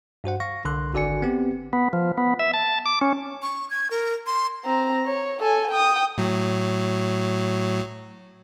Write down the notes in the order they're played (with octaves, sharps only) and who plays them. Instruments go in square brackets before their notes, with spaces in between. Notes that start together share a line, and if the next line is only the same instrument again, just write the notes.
[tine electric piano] G2 F#4 C5 F#5
F5 C#6 A#6
C2 D3 C6 F#6
G#1 D3 F#4 D5 G#5 C#7
B3 C4 G4
[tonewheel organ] B3
F3
B3
E5
A5
D6
C#4
[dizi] C#6
G#6
A#4
C6
[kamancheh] C4 A#5
C#5
A4 G#5
G5 D#6
[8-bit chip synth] A2 F#3